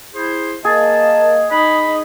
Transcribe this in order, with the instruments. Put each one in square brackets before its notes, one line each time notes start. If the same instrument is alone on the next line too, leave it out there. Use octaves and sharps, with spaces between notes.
[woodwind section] E4 G#4 C5
[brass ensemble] A#3 D#5 [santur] G#4 [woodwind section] A5
[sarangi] D#4 [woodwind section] B5